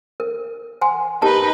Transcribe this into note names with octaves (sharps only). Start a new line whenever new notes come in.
A#4
F#5 G#5 C6
D#4 G4 A#4 B4 A5